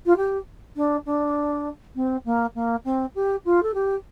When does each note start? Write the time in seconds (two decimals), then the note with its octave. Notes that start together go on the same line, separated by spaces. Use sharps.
0.06 F4
0.17 G4
0.76 D4
1.06 D4
1.96 C4
2.25 A#3
2.55 A#3
2.85 C4
3.15 G4
3.45 F4
3.63 A4
3.74 G4